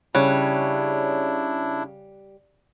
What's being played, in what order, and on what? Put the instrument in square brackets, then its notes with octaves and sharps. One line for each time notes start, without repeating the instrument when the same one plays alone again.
[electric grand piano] C#3 C#5 F#6 [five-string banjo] G3 [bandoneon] D4 E4